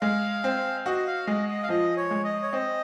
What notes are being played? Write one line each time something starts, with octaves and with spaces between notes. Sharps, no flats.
G#3 F5
C4
F#4 D#5
F5
G#3 D#5
D#5
F5
F3 D#5
C#5
G#3
D#5
C#5
C4 D#5